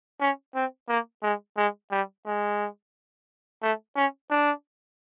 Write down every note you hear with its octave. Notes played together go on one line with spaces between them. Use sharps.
C#4
C4
A#3
G#3
G#3
G3
G#3
A3
C#4
D4